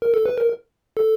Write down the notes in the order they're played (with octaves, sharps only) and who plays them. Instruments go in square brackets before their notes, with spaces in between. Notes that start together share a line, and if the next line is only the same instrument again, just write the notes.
[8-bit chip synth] A#4
A4
B4
A#4
A4